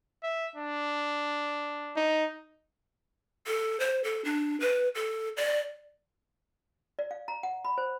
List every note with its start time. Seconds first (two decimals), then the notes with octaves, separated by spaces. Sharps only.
0.23 E5
0.56 D4
1.96 D#4
3.47 A4
3.80 C5
4.04 A4
4.25 D4
4.60 B4
4.95 A4
5.37 D5
6.99 D5
7.11 F5
7.28 A#5
7.43 F#5
7.65 B5
7.78 C5